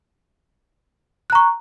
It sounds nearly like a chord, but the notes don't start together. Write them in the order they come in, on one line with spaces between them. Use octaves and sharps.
F#6 A#5 C#6